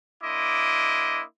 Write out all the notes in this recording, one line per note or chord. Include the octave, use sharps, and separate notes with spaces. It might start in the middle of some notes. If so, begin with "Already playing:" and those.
A#3 D4 E4 D#5 C6 D6